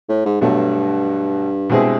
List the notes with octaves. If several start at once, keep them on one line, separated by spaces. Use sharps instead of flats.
A2
G#2
G2 B2 F#3 A3
B2 G#3 C4 E4 G#4